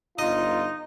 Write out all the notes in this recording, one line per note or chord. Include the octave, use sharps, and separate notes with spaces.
G1 D#4 F4 D#5